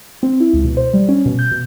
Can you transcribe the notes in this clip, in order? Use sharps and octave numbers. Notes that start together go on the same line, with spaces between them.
C4
E4
C#2
B2
C5
G3
C#4
B2
G6
B2